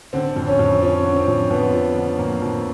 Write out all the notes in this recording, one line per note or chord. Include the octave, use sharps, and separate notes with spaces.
D3 C4
F2
C#4
F2
F3 C#4
D3
C4
F2
F2 B3
F3
D3
F2 A#3
F2